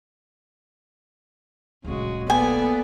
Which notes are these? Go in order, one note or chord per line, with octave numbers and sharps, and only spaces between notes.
D1 A#1 C#3 G#3 F#4
A#3 B3 A4 D5 G#5